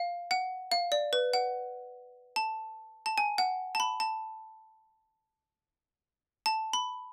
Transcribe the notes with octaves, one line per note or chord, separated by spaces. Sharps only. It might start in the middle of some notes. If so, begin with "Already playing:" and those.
Already playing: F5
F#5
F5
D5
B4
F#5
A5
A5
G#5
F#5
A5
B5
A5
A5
B5